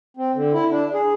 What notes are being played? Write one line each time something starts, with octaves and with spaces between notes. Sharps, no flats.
C4
D3
E4
D4
G#4